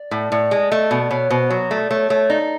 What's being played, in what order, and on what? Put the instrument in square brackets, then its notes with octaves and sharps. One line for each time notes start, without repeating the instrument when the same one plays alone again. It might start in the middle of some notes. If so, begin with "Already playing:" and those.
Already playing: [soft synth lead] D5
[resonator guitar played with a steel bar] A2
[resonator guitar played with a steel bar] A2 [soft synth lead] D5
[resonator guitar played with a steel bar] G#3
[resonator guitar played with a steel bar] A3 [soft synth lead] D#5
[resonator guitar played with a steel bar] B2 [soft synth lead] D5
[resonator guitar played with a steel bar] B2 [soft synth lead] C#5
[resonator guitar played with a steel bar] B2 [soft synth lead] C5
[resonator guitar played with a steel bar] F#3 [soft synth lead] C#5
[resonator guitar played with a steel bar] A3 [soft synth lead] D5
[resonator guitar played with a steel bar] A3 [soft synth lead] C#5
[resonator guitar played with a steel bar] A3 [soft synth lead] C#5
[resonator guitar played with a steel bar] D#4 [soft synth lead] D5